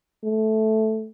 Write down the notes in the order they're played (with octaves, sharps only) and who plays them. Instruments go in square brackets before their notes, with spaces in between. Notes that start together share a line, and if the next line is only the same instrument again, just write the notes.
[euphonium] A3